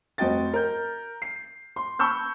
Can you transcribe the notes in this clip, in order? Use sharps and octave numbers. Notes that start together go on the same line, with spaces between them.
F1 C4 F#4 D#5 G5 A6
A#4 G6
C7
C6
A5 B5 C#6 E6 G6